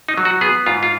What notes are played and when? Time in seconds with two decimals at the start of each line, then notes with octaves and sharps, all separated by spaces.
0.09 D#4
0.18 F#3
0.25 F#4
0.41 B3 G#4
0.66 G#2 F4
0.83 F4